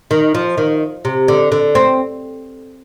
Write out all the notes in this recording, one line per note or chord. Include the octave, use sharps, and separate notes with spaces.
D#3
F3
D#3
C3
D3
D3
C4